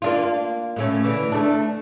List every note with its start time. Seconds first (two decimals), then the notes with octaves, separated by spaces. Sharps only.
0.02 A#3 D4 F4
0.76 A2 A3 C#4
1.04 D3 E3
1.32 A3 D4